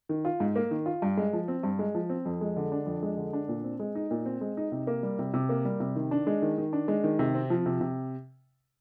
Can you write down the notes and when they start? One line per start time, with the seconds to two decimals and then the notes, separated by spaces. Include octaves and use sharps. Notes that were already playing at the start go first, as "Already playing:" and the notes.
0.09 D#3
0.25 F4
0.40 G#2
0.56 A#3
0.71 D#3
0.86 F4
1.02 G2
1.17 G#3
1.33 F3
1.48 C4
1.63 G2
1.79 G#3
1.95 F3
2.10 C4
2.26 F2
2.41 G#3
2.57 D3
2.72 D4
2.86 F2
3.03 G#3
3.17 D3
3.33 D4
3.48 A#2
3.64 C4
3.80 G#3
3.95 D#4
4.11 A#2
4.26 C4
4.41 G#3
4.57 D#4
4.72 C3
4.87 A#3
5.03 G3
5.19 C3
5.34 C3
5.49 A#3
5.65 G3
5.80 C3
5.96 D#3
6.11 D4
6.27 G#3
6.42 D#3
6.58 D#3
6.73 D4
6.88 G#3
7.04 D#3
7.19 C3
7.34 C4
7.50 F3
7.66 C3
7.81 C3